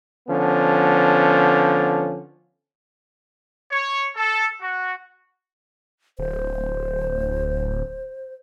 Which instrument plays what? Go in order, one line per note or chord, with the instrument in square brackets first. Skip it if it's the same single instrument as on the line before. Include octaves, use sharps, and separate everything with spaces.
[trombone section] D3 F3 B3 C#4
[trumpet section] C#5
A4
F#4
[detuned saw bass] D1 [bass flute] C5